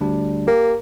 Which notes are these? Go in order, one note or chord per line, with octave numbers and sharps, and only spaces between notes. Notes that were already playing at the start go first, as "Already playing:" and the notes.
D2 G3 D4
A#3 G4